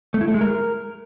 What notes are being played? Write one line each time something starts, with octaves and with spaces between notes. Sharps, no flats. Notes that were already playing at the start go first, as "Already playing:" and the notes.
A3
E4
A3
G#3
A#4